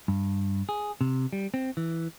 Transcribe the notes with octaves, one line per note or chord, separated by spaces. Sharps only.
G2
G#4
C3
G3
C4
E3